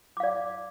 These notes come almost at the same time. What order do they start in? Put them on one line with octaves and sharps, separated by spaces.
D6 F5 D5